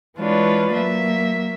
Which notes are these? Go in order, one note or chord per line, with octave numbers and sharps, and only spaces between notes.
E3 G#3 D4 F4 B4 C#5
F#3 A#3 E5